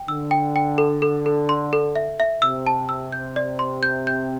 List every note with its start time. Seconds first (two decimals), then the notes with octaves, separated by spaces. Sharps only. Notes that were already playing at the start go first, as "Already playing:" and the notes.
Already playing: G5
0.08 D3 E6
0.31 G5
0.56 G5
0.78 A4
1.02 A4
1.26 A4
1.49 C6
1.73 A4
1.96 E5
2.20 E5
2.42 C3 E6
2.67 A5
2.89 E6
3.12 G6
3.36 D5
3.59 C6
3.83 G6
4.07 G6